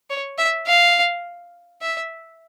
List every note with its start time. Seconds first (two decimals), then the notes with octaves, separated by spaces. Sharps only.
0.10 C#5
0.38 E5
0.67 F5
1.81 E5